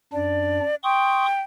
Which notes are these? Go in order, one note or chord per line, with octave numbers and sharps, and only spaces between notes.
F#2 D4 D5
G5 C6 C#6 D#6